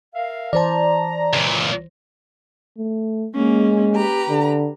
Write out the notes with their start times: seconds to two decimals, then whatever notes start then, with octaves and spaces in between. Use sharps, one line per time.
0.14 A#4 E5 F5
0.53 E3 C5 D5 A5 A#5
1.33 C#2 A#2
2.78 A3
3.35 G#3 A#3 C#4
3.94 G4 B4 A#5
4.30 D3